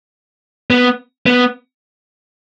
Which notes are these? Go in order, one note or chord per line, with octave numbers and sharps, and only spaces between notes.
B3
B3